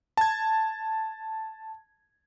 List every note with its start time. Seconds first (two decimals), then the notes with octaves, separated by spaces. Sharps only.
0.17 A5 G#6